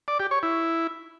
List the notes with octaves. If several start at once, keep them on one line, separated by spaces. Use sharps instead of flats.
D5
G4
C#5
E4